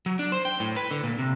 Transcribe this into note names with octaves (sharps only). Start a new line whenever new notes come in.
F#3
D4
C5
G5
A2
B4
D3
A#2
C3